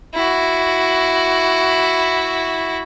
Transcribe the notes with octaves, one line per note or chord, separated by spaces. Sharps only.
E4 F#4